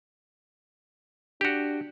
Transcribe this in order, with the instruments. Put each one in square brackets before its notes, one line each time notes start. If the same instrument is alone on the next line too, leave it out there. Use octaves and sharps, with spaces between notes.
[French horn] D4 [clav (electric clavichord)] F#4 G4